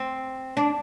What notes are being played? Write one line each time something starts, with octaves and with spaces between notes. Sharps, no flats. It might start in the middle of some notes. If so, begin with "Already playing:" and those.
Already playing: C4
D4